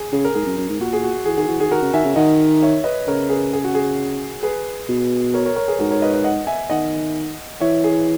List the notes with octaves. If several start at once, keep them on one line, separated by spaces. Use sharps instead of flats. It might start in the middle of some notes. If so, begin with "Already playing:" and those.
Already playing: G#4
C#3 G#4
A#4
G#2 G#4
F#2
F#2
G#2
A#2 F#4
G#4
F#4
E3 G#4
D#3 G#4
E3 F#4
D#3 G#4
D#3 F#4 A#4
C#3
D#3 E5 G#5
C#3
D#3 D#5 F#5
C#5 E5
B4 D#5
C#3 A#4 C#5
G#4 B4
G#4
F#4
G#4
G#4 B4
B2
A#4 C#5
A#4 C#5
A#4 C#5
G#4 B4
G#2 F#4 A#4
A#4 C#5
B4 D#5
B4 D#5
D#5 F#5
E5 G#5
D#3 D#5 F#5
E3 C#5 E5
G#4